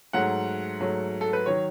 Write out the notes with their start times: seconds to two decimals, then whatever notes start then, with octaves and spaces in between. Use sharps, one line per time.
0.13 G#2 F#3 A3 F#5
0.80 G#2 F#3 A3
1.21 A4
1.33 B4
1.46 D#3 F#3 C#5